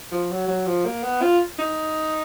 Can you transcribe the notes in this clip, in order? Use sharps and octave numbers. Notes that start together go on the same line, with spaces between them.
F3
F#3
F#3
F3
A#3
B3
F4
D#4